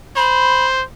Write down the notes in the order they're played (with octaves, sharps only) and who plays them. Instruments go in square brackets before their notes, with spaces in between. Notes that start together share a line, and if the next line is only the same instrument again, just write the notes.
[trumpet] C5 [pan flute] B5